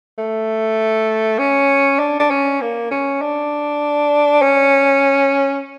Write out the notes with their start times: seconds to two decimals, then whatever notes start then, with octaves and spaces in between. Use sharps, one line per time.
0.19 A3
1.39 C#4
1.99 D4
2.20 D4
2.31 C#4
2.61 A#3
2.91 C#4
3.22 D4
4.42 C#4